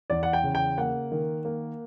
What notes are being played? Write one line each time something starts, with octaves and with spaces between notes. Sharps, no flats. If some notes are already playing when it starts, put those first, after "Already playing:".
E2 D5
F#5
G5
C#3
G5
A#3 F#5
D#3
A#3